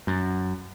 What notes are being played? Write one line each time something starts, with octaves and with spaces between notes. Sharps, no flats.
F#2